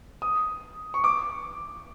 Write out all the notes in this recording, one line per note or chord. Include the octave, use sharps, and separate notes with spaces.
D#6
C#6
D6